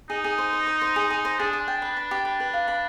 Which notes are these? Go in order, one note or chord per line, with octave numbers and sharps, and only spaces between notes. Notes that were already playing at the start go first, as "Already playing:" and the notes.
D#4 G#4
G#4
C5
C5
C5
C5
G#4
G#4
C5
D4 G#4
G#4
G5
B4
B5
G4
D4 B4
B4
F5
B5